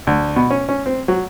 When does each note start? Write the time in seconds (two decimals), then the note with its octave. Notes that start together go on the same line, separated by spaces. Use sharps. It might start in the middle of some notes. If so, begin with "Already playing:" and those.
0.07 D2
0.36 B2
0.51 C#4
0.69 C#4
0.86 C4
1.08 F#3